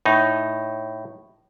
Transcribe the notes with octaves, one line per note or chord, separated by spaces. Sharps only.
A2 D#4